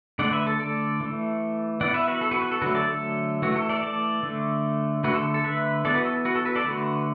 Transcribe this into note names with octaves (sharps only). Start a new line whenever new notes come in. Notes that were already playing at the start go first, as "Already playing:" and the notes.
D3 A3 D5 F#5
B4 E5
A4
A4 D5
E3 A3
E3 B3 D5 F#5
B4 E5
F#4 B4
A4
F#4 B4
F#4
A4
D3 F#3 A3 F#4 B4
A4 D5
A4
E3 A3 F#4
A4
A4 D5
A4 D5
D3 A3
D3 A3 F#4 B4
A4
A4
B4 E5
E3 B3 A4 D5
F#4 B4
A4
F#4 B4
A4
F#4 B4
A4 D5
D3 A3 F#4 B4